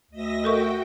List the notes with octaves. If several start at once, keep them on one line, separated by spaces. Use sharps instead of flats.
D2 D#5 E5 A#6
F#4 A4 A#4 G5 C#6